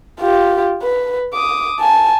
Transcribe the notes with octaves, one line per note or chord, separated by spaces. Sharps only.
F4 G4
B4
D6 D#6
G#5 A5